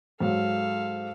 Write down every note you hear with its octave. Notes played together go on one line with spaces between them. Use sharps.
G#2 F#3 A4 F5